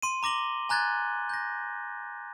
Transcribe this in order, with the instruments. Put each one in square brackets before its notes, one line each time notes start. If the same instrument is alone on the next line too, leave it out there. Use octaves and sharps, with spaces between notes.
[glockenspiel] C6 D#7
A#5 D6 A#6 F#7 G7
G#5 A#5 F#6 G#6 A6
G6 A#6